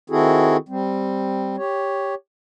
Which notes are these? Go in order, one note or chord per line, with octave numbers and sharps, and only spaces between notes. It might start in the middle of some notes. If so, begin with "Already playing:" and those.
D#3 C4 E4 F#4 G#4 A4
G3 C4
G4 C#5